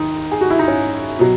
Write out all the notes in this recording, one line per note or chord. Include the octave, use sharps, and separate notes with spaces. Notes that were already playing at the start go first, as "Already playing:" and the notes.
Already playing: D#2 D#4
G#4
F#4
E4
D#4
C#4
B2 F#3